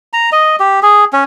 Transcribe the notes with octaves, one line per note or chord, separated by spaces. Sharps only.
A#5
D#5
G4
G#4
C#4